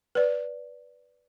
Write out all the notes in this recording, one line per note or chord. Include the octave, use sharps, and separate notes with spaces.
B4 D5